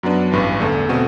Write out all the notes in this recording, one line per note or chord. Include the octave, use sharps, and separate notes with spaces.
F#2 F#3 B3 D4
A1 G2 E3
E2 D3 A3
B2 A3 C4 F#4